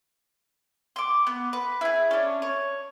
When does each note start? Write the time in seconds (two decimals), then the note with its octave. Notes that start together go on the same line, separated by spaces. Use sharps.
0.96 C6 D6
1.27 B3
1.53 B4
1.81 E4 G#4
2.11 C#4 D4
2.42 C#5